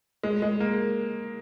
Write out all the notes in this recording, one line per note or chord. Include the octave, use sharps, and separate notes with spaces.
G#3
G#3
A#3